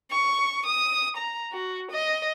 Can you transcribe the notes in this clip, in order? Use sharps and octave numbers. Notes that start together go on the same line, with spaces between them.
C#6
D#6
A#5
F#4
D#5